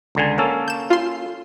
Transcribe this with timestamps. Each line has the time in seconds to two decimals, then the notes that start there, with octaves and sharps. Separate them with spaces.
0.15 C#2 D3 G#5
0.38 A#3 C#4 A4
0.68 G6 E7
0.90 F4 C6